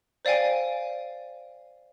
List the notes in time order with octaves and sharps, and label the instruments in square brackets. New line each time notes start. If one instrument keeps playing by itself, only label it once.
[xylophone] C5 D5 F5 G5 G#5